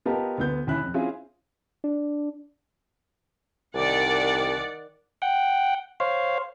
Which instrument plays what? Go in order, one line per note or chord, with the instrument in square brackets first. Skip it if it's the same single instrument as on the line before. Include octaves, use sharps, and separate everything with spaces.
[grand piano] B3 F4 G4 A#4 D#5 A5
D2 B3 G6
D#2 C#4 E4 E5 B5 F#6
F2
C4 C#4 E4 F4 G#4
[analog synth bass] D4
[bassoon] C2 [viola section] D#3 D5 F#5
[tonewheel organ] F#5 G5
C5 C#5 F5